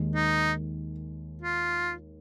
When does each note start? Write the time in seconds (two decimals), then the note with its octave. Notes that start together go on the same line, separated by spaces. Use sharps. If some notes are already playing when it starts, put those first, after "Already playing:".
Already playing: D#2 D#3 G#3
0.14 D#4
1.42 F4